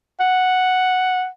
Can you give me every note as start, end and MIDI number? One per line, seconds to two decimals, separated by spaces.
0.20 1.27 78